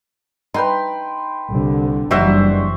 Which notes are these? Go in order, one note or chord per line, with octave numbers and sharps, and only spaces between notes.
D#4 B4 G5 C6
C2 D3
F#1 E3 G3 D4 D#4 F#4 C5 E5